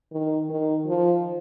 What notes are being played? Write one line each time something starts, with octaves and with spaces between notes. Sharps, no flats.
D#3
D#3
F3